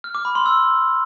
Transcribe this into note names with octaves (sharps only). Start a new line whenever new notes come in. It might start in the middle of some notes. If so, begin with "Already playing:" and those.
F6
D6
B5
C6
E6